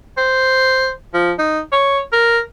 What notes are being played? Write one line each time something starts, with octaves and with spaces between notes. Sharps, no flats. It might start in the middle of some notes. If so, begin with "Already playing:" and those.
C5
F3
D#4
C#5
A#4